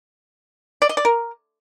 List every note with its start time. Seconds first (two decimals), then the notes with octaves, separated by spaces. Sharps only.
0.82 D5
0.89 D#5
0.97 D5
1.05 A#4